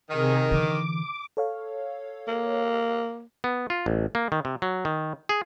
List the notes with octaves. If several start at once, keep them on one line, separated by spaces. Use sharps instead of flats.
C3 D#3 G#4 A#4
D3 E3 D6
A4 C#5 F5
A#3
B3
F4
A1
A#3
D#3
C3
F#3
D#3
G#4